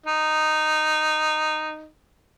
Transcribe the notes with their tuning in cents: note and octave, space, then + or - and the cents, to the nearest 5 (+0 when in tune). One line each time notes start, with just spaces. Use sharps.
D#4 -10